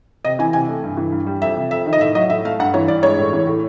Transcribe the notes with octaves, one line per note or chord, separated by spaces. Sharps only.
C3 D#5
E3 G#5
C3 G#5
A3
G2
E3
G2
G3
F2 E5
C3
F2 E5
D#3
D#5
A2 E5
F#3 D#5
A2 E5
A3 F5
G2 F#5
E3 C#5
G2 D5
G#3 C#5
A2
E3
A2